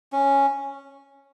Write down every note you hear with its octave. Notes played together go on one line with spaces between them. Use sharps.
C#4